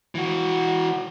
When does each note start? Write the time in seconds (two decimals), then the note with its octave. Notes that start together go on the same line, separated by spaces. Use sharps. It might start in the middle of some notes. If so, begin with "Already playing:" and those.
0.15 E3 F#4